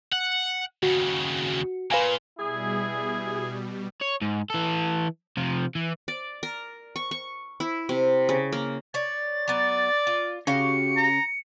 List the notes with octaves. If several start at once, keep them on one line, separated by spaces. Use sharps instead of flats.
F#5
D#2 C#3 F#4
A#2 B4 F5 G#5
B2 G3 E4 G#4
C#5
G#2
E3 A4
C3 F3
E3
D5
A#4
C#6
C#6
E4
C3
C#3
A#3
C#5 D5 A6
F#3 B3 D5
F4
C#3 F#4 G4 F5 C#7
A#5